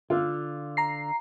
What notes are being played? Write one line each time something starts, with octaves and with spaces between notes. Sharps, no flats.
D3 F4
A#5 C7